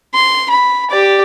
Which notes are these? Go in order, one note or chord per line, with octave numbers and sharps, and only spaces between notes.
C6
B5
G4 D5